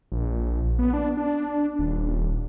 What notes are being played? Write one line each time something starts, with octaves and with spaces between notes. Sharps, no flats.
A#1
B3
D4
D4
D#1